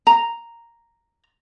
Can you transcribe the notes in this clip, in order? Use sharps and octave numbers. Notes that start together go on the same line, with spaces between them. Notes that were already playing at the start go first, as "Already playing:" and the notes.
A#5